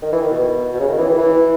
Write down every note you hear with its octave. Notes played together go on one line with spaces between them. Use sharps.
D#3
E3
D#3
B2
B2
C#3
D#3
E3
E3
E3